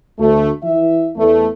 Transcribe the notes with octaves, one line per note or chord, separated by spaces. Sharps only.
D2 A3
E3 E5
E2 A3